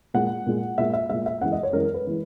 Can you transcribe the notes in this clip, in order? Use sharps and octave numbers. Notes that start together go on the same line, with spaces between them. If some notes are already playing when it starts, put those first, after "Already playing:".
A#2 G#3 F#5
A#2 G#3
A#2 G#3 E5
E5
A#2 G#3 E5
E5
F#2 E3 G#3 F#5
D#5
C#5
F#2 E3 G#3 A#4
B4
E3 G#3